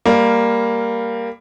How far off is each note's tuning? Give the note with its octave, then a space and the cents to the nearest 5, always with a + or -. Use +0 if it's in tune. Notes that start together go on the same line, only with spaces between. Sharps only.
G3 +20 A#3 +0